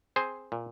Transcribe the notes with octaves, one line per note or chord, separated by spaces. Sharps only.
C4 G#4 C5
A#2